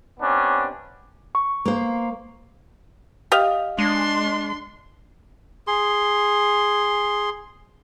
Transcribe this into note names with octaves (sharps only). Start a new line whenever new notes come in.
C3 B3 C#4 D4
C#6
A#3 C5
G4 D#5 F5
G#3 D4 C6
G#4 C6